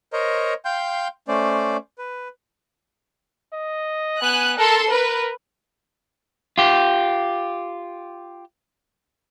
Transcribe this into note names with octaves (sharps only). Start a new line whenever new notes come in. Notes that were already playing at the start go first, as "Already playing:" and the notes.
A#4 C5 C#5 D#5 A#5
F5 G5 C6 G6
A3 C#4 C5 D5
B4
D#5
B3 G#5 F#6
A4 A#4 C6
A#4 B4
F4 G4